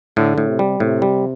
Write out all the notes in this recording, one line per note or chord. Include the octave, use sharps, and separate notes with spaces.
A2 D3
A2
C3
G3
A2 C3
G3